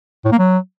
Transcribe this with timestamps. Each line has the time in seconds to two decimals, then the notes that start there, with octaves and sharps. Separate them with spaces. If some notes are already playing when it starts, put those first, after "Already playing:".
0.25 A2
0.32 A#3
0.39 F#3